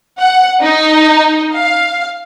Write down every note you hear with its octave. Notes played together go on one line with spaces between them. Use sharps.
F#5
D#4
F5